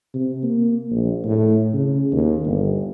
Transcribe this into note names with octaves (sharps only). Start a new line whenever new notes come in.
C3
A#3
A#1
A2
C#3
D#2
G1